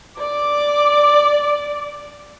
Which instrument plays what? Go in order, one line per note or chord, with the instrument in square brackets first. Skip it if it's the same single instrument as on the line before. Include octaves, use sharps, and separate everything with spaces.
[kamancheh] D5 D6